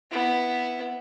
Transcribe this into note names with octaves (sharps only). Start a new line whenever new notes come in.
B3 E4